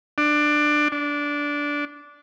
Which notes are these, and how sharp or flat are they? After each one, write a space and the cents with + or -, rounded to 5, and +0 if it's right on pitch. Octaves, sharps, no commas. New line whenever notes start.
D4 +20
D4 -10